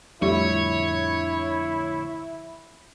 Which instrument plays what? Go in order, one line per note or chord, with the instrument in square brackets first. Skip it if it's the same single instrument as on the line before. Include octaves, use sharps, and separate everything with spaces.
[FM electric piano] F2 A2 D3 [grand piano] G3 [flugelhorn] E4 [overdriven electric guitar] C#5